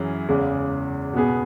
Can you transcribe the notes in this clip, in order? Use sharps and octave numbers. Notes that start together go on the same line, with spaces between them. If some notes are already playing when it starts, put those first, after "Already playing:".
Already playing: F#2 E3 C#4 G#4
E2 C#3 G#3
B2 B3 G#4